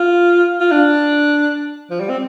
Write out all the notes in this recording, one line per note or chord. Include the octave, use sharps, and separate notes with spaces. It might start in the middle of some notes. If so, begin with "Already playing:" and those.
Already playing: F4
F4
D4
F3
G3
C4